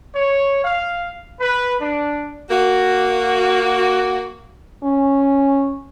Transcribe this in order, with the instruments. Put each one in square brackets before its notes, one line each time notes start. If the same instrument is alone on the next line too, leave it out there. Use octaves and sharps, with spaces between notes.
[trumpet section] C#5
F5
B4
D4
[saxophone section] A#3 F#4
[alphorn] C#4